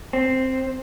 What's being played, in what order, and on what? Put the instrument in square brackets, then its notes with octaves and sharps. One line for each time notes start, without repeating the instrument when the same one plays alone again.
[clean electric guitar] C4